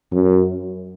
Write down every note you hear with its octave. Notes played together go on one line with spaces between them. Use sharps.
F#2